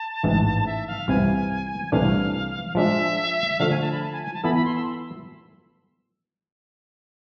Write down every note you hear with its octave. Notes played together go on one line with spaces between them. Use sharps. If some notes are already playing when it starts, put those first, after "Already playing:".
Already playing: A5
A1 G#2 E3
E5
F5
C2 C3 E3 G#5
C2 C3 E3 A3 D4 F5
F3 G#3 D4 E5
D3 F3 A3 F5
G#5
A5
B5
A5
G#5
G#5
A5
E3 B3 E4 A4 B5
B5
C6
E6